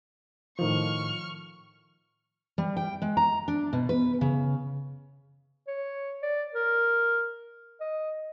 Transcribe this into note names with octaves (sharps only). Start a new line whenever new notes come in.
A2 D#3 F3 C#6 F6
G3
G5
G#3
A#5
D4
B2
B4
C#3
C#5
D5
A#4
D#5